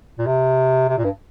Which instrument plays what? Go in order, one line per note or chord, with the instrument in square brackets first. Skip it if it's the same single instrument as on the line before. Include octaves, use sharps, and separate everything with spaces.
[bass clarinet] A#2
C3
C3
A#2
G2